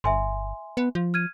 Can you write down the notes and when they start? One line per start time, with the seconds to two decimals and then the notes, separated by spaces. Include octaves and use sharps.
0.04 G1 E5 G#5 C6
0.77 B3
0.95 F3
1.14 F6 G#6 D#7